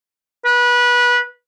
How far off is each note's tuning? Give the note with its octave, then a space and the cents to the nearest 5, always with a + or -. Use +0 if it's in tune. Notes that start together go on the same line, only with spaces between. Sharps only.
B4 -25